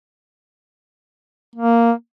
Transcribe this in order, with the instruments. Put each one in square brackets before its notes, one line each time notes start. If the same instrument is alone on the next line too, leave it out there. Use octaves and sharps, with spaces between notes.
[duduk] A#3